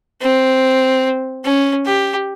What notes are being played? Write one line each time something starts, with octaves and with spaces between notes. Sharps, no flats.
C4
C#4
G4